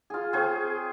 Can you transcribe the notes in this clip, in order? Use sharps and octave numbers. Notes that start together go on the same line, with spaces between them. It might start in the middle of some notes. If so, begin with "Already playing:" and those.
F4 G#4
C4 G#4 C#5